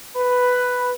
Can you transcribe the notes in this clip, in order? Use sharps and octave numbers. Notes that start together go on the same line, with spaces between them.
B4